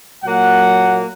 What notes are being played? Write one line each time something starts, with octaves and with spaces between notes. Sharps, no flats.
A#2 F#3 A#3 F#5